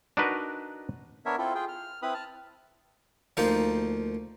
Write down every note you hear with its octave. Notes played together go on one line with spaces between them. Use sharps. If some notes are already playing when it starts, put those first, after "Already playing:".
D4 D#4 F#4 A#4 B4 D#5
B3 D4 A#4 C#5 E5
C4 E4 F4 A4
F4 G#4 G5
F6
C4 E4 B4 B5 D#6
A5 F6
D2 F3 A#3 D#4 C5